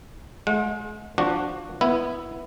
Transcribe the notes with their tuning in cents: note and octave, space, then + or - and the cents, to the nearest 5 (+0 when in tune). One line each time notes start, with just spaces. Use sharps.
G#3 +35 F#5 -40
F3 +5 D4 +0 F#4 -5
B3 +0 E4 +5